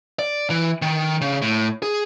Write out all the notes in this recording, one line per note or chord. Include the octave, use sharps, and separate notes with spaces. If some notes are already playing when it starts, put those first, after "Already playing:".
D5
E3
D#3
C#3
A2
G#4